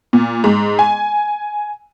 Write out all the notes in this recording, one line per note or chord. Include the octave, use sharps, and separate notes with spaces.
A#2
G#2
G#5